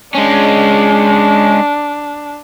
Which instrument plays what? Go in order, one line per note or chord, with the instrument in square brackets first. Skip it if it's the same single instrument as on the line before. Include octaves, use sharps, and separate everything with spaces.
[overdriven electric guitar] G#3 C#4 [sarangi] D4